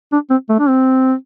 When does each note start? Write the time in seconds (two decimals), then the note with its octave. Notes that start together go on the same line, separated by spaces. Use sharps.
0.13 D4
0.30 C4
0.50 A3
0.59 D4
0.69 C4